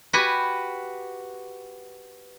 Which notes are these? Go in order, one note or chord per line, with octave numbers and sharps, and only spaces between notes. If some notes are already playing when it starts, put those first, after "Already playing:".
F#4 G4 B4 G#5